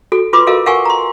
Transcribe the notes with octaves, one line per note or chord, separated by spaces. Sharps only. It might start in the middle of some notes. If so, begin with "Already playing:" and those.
F#4 A4
F4 B4 C6 D6
F#4 A4 A#4 D#5 F5
A#4 F5 F#5 G#5 C#6
A#5 C6